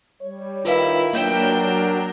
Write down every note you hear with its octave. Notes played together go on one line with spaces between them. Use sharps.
G3 C#5
D#3 E4 F4 B4 F5
F#3 A#3 D4 A#4 C#5 G5 G6 E7